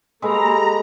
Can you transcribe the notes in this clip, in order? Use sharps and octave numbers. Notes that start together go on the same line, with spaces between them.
G#3 A#3 G4 A4 B4 A#5